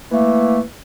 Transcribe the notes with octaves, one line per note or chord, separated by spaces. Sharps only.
E3 A3 A#3